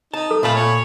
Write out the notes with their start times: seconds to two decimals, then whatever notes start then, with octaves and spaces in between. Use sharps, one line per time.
0.14 D#4 A5
0.31 A4
0.43 A#2 A3 F4 A5 B5
0.55 C#5